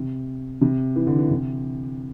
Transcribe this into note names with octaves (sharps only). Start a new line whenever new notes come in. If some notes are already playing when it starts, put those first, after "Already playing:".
Already playing: C3
C3
E3
D3
E3
C3